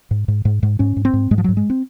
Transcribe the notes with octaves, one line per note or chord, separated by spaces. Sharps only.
G#2
G#2
G#2
G#2
G#2 C#4
G#2
C4
G#2
G#2 G#3
F3
G#2 F#3
G#3
C4